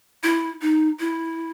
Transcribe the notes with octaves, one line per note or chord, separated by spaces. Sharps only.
E4
D#4
E4